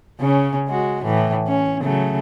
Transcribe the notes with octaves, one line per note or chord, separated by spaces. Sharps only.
C#3 C#4
G#3 F#4
A2 E3
C#4
C#3 F#3 A3